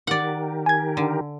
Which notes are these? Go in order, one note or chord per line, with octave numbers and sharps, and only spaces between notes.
D#3 G4 A#4 D5 F#5
G#5 G#6
D3